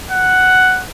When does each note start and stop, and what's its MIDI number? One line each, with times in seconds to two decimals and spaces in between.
0.11 0.83 78